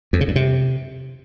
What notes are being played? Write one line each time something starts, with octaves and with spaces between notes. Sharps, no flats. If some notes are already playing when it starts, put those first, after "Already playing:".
F2
C#3
G2
C3